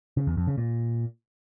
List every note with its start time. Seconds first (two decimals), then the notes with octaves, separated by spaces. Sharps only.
0.17 C#3
0.27 E2
0.37 F2
0.47 C#3
0.58 A#2